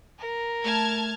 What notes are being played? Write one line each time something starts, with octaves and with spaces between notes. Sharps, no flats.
A#4
A3 A5 F6 G#6